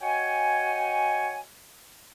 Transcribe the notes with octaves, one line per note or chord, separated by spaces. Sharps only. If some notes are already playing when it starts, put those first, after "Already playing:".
F#4 C#5 D#5 G5 G#5